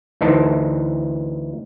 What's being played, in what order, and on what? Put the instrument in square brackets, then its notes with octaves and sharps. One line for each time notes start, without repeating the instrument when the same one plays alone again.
[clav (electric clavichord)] D2 E3 D#4 C5 A5